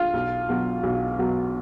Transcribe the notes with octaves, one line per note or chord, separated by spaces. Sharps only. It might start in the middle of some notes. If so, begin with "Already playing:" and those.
Already playing: F4
B1
B2 F#3
B1
B2 F#3